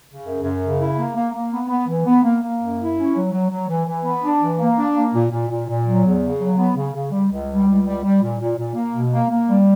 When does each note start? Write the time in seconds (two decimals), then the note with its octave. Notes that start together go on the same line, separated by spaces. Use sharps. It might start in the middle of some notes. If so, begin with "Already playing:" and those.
0.07 C#3
0.24 F#2
0.43 F#2
0.61 C#3
0.79 E4
0.97 A#3
1.16 A#3
1.33 A#3
1.51 B3
1.69 B3
1.88 E3
2.06 B3
2.24 A#3
2.42 A#3
2.60 F#2
2.78 E4
2.96 C#4
3.14 F#3
3.32 F#3
3.50 F#3
3.68 E3
3.86 E3
4.05 B3
4.23 D4
4.40 E3
4.59 A#3
4.77 D4
4.95 A#3
5.13 A#2
5.31 A#2
5.49 A#2
5.68 A#2
5.86 F#3
6.04 E2
6.23 C#3
6.41 F#3
6.58 B3
6.76 C#3
6.94 C#3
7.12 G3
7.31 C#2
7.49 G3
7.68 C#2
7.85 G3
8.03 G3
8.22 A#2
8.39 A#2
8.57 A#2
8.75 A#3
8.93 B2
9.12 A#3
9.30 A#3
9.48 G3